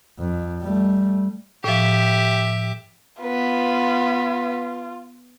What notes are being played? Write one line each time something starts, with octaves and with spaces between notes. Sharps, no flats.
F2
G3 A3
A2 F3 G4 E5
B3 F4 B4